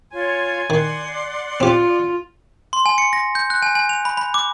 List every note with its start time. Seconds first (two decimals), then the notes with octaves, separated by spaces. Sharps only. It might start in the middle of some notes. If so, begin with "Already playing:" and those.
0.13 F4 C#5 G#5 C6
0.70 D#3 D5 F#5 C6
1.60 C4 F4 G4
2.73 C6
2.86 G#5
2.98 C#7
3.13 A#6
3.35 G6
3.50 F#6
3.62 G#5
3.75 G#5
3.89 F7
4.05 B5
4.17 B5
4.34 D6